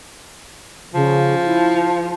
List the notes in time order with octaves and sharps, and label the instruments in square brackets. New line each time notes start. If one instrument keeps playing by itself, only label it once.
[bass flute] C#3 [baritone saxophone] F3
[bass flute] E4